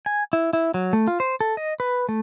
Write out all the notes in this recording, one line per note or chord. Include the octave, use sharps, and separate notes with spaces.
G#5
E4
E4
F#3
A3
F4
C5
A4
D#5
B4
A3